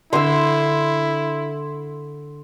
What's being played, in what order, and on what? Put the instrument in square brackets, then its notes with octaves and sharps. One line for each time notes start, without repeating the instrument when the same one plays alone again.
[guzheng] D3 [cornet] E4 [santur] C6 E6